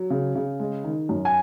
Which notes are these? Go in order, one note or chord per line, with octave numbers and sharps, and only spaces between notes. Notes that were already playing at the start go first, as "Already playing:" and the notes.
Already playing: F#3
C#3
C#3
G#3
D#3
F#2
G#5